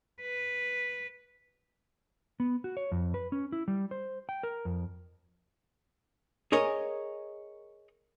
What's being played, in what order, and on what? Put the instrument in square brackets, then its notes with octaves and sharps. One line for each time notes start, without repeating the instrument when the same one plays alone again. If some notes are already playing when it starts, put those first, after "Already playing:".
[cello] B4
[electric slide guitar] B3
F#4
C#5
F2
B4
C#4
E4
G3
C5
G5
A#4
F2
[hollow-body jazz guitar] G#4 A#4 C#5 D#5